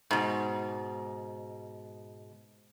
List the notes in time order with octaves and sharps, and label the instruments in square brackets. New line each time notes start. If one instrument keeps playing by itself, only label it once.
[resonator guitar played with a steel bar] G#2 B2